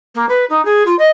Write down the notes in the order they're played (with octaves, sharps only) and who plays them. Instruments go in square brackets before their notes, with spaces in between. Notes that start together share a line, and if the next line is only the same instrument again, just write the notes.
[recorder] A#3
B4
D#4
G#4
F4
D#5